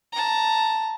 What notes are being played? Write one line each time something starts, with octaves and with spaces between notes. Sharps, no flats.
A5 A#5